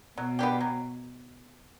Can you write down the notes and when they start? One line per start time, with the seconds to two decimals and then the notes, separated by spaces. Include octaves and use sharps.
0.17 B2 F#3
0.39 B3 D4 G4
0.61 F#3